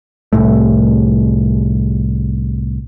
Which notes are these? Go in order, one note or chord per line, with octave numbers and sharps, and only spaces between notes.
C2 A2 A3